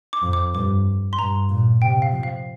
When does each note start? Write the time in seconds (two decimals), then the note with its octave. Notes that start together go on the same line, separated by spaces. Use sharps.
0.13 D6
0.23 F2
0.33 D6
0.54 G2 D6
1.13 C6
1.18 G2 A#5
1.49 A#2
1.82 C3 G5
2.02 F5
2.12 F3
2.23 F5